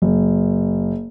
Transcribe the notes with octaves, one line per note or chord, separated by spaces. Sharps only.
F#1